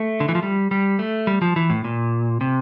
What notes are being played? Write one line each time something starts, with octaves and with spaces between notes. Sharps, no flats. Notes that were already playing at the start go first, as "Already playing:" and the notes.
Already playing: A3
D3
E3
F3
G3
G3
A3
G3
F3
E3
A2
A#2
C3